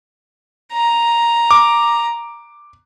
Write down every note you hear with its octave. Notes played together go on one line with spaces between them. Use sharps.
A#5
D6